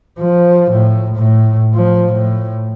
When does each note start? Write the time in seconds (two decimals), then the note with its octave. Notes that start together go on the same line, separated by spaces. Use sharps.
0.19 F3
0.71 A2
1.16 A2
1.74 F3
2.13 A2